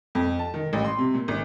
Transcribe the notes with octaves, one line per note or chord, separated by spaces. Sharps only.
F2
A5
D#3
A1
C6
C3
A#2
G#1